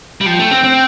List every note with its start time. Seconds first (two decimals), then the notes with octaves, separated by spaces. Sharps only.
0.21 G3
0.26 F3 G5
0.39 A3
0.51 C4
0.64 C4